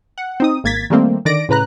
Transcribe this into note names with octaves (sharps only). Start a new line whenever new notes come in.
F#5
C4 D#4 D#6
G#1 A#3 G#6 A6 B6
D#3 G3 A3 A#3 C4
D3 D#3 D5 A#6 D7
A2 C#3 B4 A#5 F#6